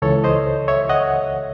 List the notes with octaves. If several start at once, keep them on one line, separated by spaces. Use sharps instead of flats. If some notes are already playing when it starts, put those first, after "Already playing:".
C#2 C#3 E3 A4 C#5
C5 D#5
C#5 E5
D#5 F#5